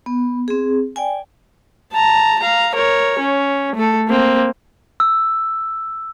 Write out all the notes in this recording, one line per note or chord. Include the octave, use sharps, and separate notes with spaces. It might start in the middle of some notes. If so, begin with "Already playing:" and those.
B3
C4 G#4
D5 G5 G#5
A5 A#5
F5 A#5
A#4 C#5
C#4
A3 A4
A#3 C4
E6